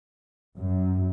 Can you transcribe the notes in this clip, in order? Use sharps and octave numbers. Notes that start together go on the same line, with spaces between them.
F#2